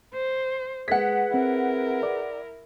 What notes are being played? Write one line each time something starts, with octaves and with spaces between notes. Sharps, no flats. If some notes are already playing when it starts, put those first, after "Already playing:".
C5
G#3 G#4 B4 F#5 B6
C4 E4 A#4
D5